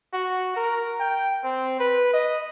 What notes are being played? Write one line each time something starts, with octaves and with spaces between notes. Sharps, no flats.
F#4
A#4
G5
C4
B4
D#5